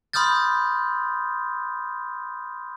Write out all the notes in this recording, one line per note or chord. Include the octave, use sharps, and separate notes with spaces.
B5 C6 D#6 F6 G6 A6